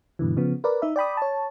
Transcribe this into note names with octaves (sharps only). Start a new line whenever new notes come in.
G2 B2 D3 E3
C#3 F3 B3
A#4 B4 D5
D#4 E5
D5 G5 B5 D#6
C#5 A5